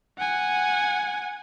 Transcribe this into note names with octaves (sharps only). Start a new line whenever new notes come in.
F#5 G#5